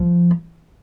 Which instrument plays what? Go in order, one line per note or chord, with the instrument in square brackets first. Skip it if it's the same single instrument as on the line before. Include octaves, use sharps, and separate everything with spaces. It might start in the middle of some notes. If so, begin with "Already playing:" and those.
Already playing: [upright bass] F3